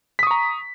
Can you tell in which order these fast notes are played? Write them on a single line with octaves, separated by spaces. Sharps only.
B6 D#6 C#6 A#5